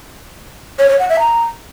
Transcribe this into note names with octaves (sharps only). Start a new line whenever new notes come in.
C#5
C#5
F#5
E5
A#5